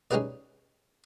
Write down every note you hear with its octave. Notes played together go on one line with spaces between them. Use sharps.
G#3 C#4 D#4 G4 B4 D5